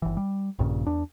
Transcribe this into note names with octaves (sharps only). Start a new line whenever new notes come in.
G1 E3
G3
A#1 G2 A#2 C#3
E2 D4